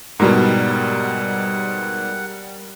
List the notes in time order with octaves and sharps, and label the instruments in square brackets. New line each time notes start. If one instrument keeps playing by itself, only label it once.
[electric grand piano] G#2 B2 [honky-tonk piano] G3 A#4 [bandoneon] F#5